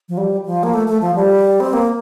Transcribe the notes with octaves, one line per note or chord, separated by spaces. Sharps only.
F3
G3
F3
A#3
A3
A3
F3
G3
C4
A#3